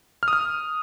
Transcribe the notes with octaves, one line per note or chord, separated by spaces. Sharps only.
F6
D#6
F6